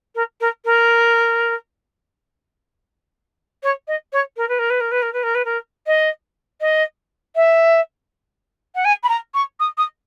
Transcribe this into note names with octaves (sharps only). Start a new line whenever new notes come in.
A#4
A#4
A#4
C#5
D#5
C#5
A#4
B4
A#4
B4
A#4
B4
A#4
B4
A#4
B4
A#4
D#5
D#5
E5
F#5
G#5
B5
A#5
C#6
D#6
D#6